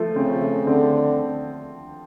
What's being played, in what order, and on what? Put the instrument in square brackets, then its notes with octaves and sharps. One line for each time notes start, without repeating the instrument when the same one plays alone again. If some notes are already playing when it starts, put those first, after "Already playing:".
Already playing: [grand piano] F3 A3
[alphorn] C#3 [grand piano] C4
[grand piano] A3
[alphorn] D3 [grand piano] C4